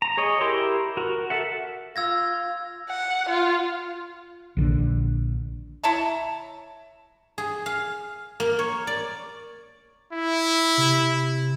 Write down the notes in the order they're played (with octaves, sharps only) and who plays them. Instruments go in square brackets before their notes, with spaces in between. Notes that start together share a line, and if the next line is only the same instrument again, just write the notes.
[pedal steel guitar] A#5
G#4 C#5 D#5
E4 G4 A#4 C6
F#4 A#4
A4 E5 F#5
[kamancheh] F4 [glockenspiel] E6 G#6 A#6
[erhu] F#5
F4
[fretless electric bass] A#1 D3
[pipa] E4 C#5 A5 A#5
[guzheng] G#4
F5
A#3
C#5
D5
[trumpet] E4
[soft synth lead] C3